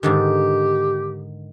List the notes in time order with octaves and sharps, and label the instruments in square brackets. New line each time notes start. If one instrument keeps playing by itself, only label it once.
[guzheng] G#2 D3 D#3 [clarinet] G4